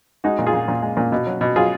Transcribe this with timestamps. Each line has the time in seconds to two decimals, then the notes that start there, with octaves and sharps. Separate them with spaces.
0.24 G#3 D#4 F#4
0.39 A#2
0.46 F4 G#4
0.53 A#2
0.68 A#2
0.82 G#3
0.97 A#2
1.12 B2
1.27 F#3
1.41 B2
1.56 F#3 F4 G#4